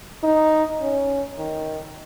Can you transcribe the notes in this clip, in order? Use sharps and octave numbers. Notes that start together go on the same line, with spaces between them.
D#4
C#4
D#3